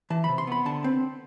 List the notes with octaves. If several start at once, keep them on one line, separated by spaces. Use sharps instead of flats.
E3 A5
C3 B5
C6
B3 B5
D3 A5
C4